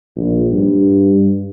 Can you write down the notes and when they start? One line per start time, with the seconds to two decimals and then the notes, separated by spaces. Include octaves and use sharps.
0.16 A#1
0.52 G2